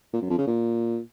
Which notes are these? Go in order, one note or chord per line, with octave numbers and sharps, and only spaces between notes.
A#2
F#2
F2
C#3
A#2